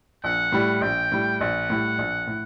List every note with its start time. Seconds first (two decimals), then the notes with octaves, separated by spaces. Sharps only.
0.24 A#1 F#5
0.52 A2 G3
0.81 A#1 G5
1.12 A2 G3
1.41 A#1 F#5
1.70 A2 G3
1.99 A#1
2.27 A2